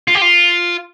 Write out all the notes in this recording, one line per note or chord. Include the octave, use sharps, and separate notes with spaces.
F4
G4
F4